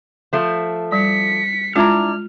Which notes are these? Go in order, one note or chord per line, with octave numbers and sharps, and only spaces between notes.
F3 A3
G3 B6 C#7
G#3 D4 E4 F4 A#5 F6